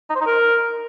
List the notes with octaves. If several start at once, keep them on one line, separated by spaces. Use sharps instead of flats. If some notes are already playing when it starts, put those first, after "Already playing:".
D#4
C5
D#4
A#4